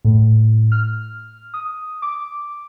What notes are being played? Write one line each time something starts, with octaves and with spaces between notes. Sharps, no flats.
A2
F6
D#6
D6